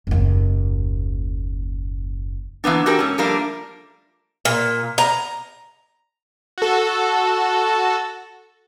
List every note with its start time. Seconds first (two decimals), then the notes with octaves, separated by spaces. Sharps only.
0.07 F#1 D#2
2.64 E3 A#3 B3 D4
2.86 F#4 G4 A4 A#4
2.99 G#2 C#4
3.18 F3 G3 A3 A#3 D4 A#4
4.45 A#2
4.98 A#5
6.58 F#4 A4